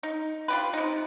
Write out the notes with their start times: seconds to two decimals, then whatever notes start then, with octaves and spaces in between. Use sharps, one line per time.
0.03 D#4
0.48 F4 G4 B4
0.73 C3 D#4